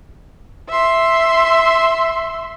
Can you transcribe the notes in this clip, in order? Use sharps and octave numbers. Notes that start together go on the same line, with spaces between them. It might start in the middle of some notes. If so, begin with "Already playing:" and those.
E5 C6